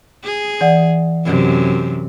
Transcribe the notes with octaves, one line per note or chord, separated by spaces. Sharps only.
G#4
E3 D5 F#5
F#2 C3